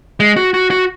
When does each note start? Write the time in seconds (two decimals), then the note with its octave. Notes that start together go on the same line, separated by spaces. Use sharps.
0.20 G#3
0.36 F#4
0.54 F#4
0.71 F#4